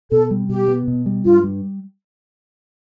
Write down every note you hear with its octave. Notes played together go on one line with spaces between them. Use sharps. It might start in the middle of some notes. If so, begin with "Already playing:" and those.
B2 A4
G3
B2 G4
B3
B2
G3
G2 F4
G3